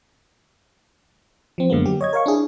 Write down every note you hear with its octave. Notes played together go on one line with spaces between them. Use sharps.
F3 C4
F#2 D3 G#3 A#3 B3
F#3 G4
C#5 D#5 G#6
A#4 C#5 F5 C#6
D4 E4 G#4